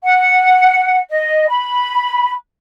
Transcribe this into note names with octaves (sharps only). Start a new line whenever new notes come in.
F#5
D#5
B5